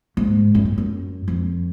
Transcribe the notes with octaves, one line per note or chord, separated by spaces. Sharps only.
G#2
F#2
G#2
F#2
F2